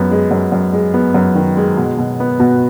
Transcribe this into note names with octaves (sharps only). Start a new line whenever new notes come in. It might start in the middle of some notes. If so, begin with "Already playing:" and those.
Already playing: F#2 G#3 B3
G#3
F#2
F#2
G#3
B3
F#2
D#3
G#3
B2
B2
B3
B2